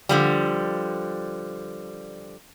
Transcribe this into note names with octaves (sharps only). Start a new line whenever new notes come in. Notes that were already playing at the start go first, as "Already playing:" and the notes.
D3 F3 G3